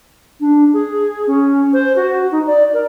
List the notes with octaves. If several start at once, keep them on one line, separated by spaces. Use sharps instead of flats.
D4
G#4
C#4
C5
F#4
D#4
D5
A#4